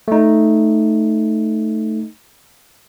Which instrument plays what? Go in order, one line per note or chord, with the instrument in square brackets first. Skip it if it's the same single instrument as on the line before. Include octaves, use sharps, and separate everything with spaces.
[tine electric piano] A3 D#4